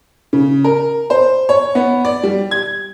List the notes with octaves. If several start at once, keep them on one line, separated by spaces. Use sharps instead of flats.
C#3
A#4
C5
C#5
B3
D5
G3
G#6